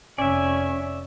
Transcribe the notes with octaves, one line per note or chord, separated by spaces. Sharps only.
F1 C#4 D5 E5 G#5